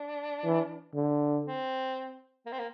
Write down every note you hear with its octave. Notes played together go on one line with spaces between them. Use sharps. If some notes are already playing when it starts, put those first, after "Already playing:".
Already playing: D4
E3
D3
C4
A#3
C4
A#3